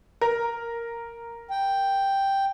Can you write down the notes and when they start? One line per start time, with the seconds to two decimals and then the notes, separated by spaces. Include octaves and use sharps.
0.21 A#4
1.51 G5